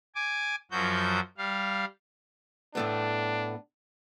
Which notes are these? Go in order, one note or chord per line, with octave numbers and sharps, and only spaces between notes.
G#5 D6
F#2 F3 F#3 F#4 G6
G3 F5
A2 A3 B3 D4